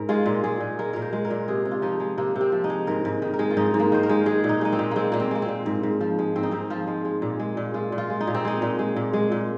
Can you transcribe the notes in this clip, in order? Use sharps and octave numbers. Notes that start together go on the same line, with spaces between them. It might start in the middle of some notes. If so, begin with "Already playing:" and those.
Already playing: G#2 A#4
G#3 F4
A#2
G#3 G#4
A#2
G#3 A#4
A#2 A#4
C5
G#3
A#4
A#2
C3 G#4
C3
F4
F3 D#4
G#3
C3 A#3
C3
C4
F3
D#4
G#3
G#2 A#4
G#2
D#3
A#4
G#3
F4
G#2 D#4
G#2
A#3
D#3 C5
A#4
G#3
G#3 G#4
A#2
D#4
G#3 D#4
C4
A#2
G#3 A#3 C4
A#2 A#3
C4
G#3 A#3
C4
A#2
G#2
G#2
F3
G#3
G#2 C4
D#4
G#2 C4
F3 F4
G#3
G#3
A#2
G#3
A#2
G#3 F4
A#2
F4
G#3
D#4
A#2
C4
G#3 D#4
A#2
G#3
A#2
G#3
A#2